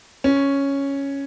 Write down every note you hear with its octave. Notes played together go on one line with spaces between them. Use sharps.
C#4